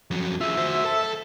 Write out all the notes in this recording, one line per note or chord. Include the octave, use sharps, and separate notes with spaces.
F2 F#3
F4 G#4 E5
F#4 C5
A4 A5